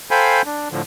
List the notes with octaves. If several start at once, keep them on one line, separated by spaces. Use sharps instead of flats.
A4 C5 F5 G5 G#5 B5
D4
A2 D3 F3